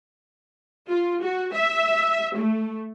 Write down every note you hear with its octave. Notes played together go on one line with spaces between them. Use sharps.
F4
F#4
E5
A3